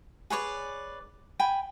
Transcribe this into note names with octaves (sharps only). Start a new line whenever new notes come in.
G#4 B4 C#5 D5
G5 G#5 B5